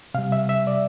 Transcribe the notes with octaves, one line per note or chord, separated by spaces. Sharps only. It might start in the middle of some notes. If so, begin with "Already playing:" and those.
C3 G3 F5
E5
E5
D5